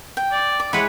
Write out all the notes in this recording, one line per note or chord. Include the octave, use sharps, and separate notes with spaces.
G5
D5
D5
G#3 E4 B4 C#5 F#5